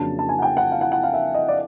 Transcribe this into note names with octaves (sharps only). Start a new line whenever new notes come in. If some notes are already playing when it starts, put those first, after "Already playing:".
Already playing: F2 C#3 F#3 A#3 D4 A5
A5
G#5
F#5
G5
F#5
F5
F#5
F#5
F5
E5
D#5
D5